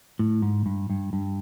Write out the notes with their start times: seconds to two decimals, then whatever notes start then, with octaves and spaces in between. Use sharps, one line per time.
0.19 A2
0.42 G#2
0.66 G2
0.90 G2
1.13 G2